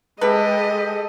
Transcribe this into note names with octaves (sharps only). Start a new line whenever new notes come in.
G#3 G4 A4 B4 D#5